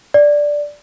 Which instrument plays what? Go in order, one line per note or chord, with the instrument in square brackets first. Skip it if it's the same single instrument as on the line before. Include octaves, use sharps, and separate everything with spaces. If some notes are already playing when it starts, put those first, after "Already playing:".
[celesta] D5